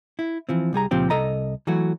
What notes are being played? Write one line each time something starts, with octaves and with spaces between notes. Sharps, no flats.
E4
E3 F3 C4
C2 G3 G#4 A#5
C#2 A#2 F3 C4 G4
C2 A4 D#5 A#5
E3 F#3 A3 F#4